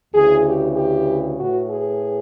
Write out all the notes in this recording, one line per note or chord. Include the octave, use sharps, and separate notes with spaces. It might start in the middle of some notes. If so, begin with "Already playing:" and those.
D2 C#3 E3 G#4
G4
G4
A2 E3 F#4
G#4